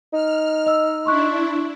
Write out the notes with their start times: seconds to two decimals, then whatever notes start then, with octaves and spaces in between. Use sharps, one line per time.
0.13 D#4 F6
0.67 D#5 E6
1.06 D4 E4 C6 C#6 F#6